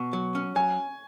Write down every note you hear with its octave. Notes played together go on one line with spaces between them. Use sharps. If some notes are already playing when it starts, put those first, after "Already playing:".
Already playing: B2 C#6
F#3
C#4
F#3 G#5